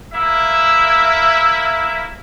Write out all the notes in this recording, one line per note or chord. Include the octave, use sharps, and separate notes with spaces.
A#3 E4 E5